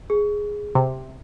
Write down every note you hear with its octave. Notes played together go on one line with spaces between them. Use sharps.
G#4
C3